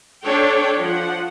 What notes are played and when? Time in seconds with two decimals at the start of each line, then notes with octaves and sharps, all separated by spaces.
0.24 D4 A4 C#5 G5
0.82 F3 F#5